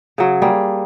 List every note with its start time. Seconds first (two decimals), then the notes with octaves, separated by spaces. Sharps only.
0.18 C#3 F#3
0.42 G3 A#3 G#4